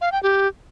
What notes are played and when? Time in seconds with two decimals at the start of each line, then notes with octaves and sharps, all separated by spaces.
0.01 F5
0.12 G5
0.23 G4